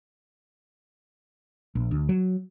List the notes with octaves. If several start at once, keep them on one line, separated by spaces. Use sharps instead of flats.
A#1
D2
F#3